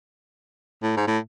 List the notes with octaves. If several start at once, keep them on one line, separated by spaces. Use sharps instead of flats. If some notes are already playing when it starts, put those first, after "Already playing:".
A2
G#2
A2